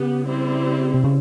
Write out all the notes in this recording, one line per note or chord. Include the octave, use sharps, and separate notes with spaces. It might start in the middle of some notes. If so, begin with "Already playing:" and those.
Already playing: C#3 B3 G4
G3 C4 E4
C3
C#3